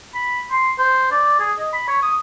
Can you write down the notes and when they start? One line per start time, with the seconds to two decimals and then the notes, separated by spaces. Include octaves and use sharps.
0.15 B5
0.51 C6
0.79 C5
1.11 D5
1.40 G#4
1.59 D#5
1.73 B5
1.88 C#5
2.03 D#6